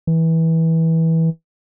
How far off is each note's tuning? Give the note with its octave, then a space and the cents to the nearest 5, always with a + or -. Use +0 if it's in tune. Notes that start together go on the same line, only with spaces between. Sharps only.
E3 -20